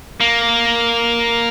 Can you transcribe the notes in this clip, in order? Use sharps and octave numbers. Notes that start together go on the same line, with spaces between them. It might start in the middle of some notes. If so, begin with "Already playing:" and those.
A#3